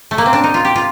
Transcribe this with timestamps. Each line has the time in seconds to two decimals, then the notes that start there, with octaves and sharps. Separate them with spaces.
0.11 A3
0.18 A#3
0.26 C4
0.33 D4
0.44 D#4
0.54 F4
0.65 G4
0.76 F4